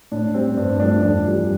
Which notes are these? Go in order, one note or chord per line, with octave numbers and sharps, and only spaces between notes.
A2 D4
G3 C4
G2 D4
F3 A3 D4
F2 D4
E3 G3